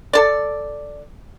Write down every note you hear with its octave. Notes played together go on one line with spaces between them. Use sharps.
A4 D5